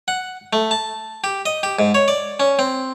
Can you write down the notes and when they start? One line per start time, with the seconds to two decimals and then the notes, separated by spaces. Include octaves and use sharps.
0.08 F#5
0.53 A3
0.71 A5
1.24 G4
1.46 D#5
1.63 G4
1.79 G#2
1.95 C#5
2.08 D5
2.40 C#4
2.59 C4